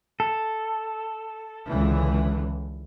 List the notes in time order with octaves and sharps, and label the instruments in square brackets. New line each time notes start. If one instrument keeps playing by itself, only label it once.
[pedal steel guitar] A4
[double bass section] C#2 D3 E3